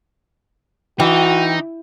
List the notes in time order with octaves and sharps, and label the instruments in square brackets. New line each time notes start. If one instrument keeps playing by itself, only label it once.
[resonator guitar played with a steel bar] E3 [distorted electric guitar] D#4 [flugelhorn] F#4 [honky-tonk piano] G5